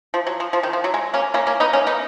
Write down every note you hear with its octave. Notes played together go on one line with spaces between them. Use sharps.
F3
F#3
F3
F3
D#3
F3
F#3
G#3
A#3 C#4
A#3 C#4
A#3 C#4
B3 D#4
A#3 C#4
B3 D#4